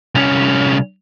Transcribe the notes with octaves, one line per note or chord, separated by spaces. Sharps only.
C2 C#4